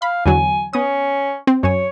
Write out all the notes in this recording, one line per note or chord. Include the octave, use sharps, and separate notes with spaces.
F5 B5
E2 D3 F#3 G#5
B3 C#4 D#6
C4
F#2 C#5 G#5